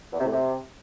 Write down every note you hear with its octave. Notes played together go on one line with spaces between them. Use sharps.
E2
C3
A2
C3